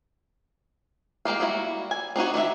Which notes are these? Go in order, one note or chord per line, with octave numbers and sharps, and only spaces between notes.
G#3 A#3 G4 F5
G3 A#3 E4 F#4
G#5
C4 D4 D#4 F#4
D#3 D4 F4 E5